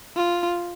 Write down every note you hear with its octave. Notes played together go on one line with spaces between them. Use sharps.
F4